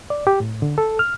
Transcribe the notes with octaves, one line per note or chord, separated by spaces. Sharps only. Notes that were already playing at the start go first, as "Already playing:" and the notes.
D5
G4
A2
D3
A4
F6